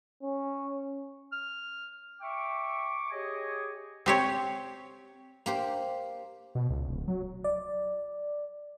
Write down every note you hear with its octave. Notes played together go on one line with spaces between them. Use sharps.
C#4
F6
E5 G5 C#6 D6
G4 G#4 C#5 D#5 G#5
C4 G4 C#5
A#3 G4 C5
B2
C#2
D1
F#3
D5